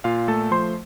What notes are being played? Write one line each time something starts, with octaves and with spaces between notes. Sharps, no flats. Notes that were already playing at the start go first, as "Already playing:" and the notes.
A#2 F4 F5
A3 A4 A5
F3 C5 C6